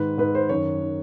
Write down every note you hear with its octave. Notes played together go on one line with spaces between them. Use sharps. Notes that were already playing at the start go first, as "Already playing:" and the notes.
Already playing: G#2 D#3 B4
G#2 D#3 B4
C5
F#2 D#3 C#5
D#3